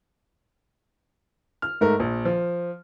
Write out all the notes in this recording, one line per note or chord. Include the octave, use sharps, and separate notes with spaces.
F6
G#2 A3 A#4
A#1
F3